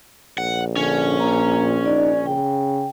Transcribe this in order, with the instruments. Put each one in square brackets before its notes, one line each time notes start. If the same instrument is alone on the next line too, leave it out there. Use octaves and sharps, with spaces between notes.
[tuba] A#1 [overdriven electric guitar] F#5
[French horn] D3 [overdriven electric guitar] C#4
[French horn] A#2 [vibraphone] A#5
[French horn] D#4 [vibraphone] D5
[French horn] C#3 [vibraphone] G5